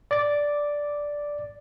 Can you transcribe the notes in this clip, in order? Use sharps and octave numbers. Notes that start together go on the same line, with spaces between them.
D5 D6 A6